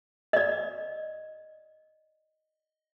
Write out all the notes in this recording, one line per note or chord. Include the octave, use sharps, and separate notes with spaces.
D5 D#5